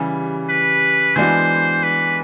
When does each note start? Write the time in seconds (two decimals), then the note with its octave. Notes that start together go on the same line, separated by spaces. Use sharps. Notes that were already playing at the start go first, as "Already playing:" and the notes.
Already playing: C#3 E3 G3
0.49 B4
1.16 E3 G#3 B3 D4 F#4 C5
1.83 B4